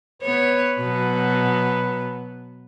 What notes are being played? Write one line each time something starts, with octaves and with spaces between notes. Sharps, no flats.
B3 B4 C#5
B2 F#3 B3